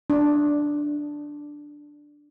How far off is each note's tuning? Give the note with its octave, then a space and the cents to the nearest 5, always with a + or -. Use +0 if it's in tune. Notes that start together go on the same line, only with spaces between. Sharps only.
D4 +0